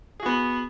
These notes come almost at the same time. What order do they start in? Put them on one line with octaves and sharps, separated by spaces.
G#4 F#4 B3